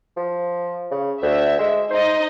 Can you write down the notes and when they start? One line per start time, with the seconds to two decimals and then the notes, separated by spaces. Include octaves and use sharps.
0.16 F3
0.91 C#3
1.22 D2 E5
1.59 G#3
1.90 D#4 C5 D#5